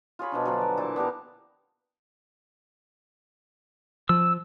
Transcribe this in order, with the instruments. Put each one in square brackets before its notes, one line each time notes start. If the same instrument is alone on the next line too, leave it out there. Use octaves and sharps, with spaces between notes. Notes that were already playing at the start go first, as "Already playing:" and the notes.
[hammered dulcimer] F4 G#4 C#5 B5
B2 F3 D4
D3 F3 F#3 D5
D5
A#2 E3 E4 A5
B3 D4 G4 A#4
[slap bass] F3 [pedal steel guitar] E6